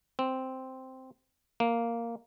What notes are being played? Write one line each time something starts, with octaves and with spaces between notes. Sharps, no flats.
C4
A#3